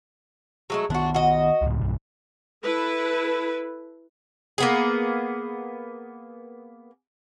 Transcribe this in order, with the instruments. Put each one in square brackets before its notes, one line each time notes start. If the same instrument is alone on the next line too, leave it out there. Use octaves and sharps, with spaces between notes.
[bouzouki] F#3 G#3 A3
[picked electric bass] D#3 B3 [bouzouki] D4 F#4
[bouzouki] F#4 D#5
[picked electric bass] C#2 A2
B1 G2
[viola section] E4 A4 B4
[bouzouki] A#3 B3 G#4